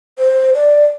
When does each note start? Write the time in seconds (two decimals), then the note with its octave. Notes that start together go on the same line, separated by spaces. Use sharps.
0.19 C5
0.54 D5